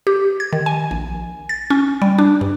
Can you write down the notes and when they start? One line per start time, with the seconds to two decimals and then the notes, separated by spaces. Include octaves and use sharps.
0.07 G4
0.40 G#6
0.53 D#3
0.66 G#5
0.91 A#1
1.49 A6
1.70 C#4
2.02 G3
2.18 D4
2.41 G2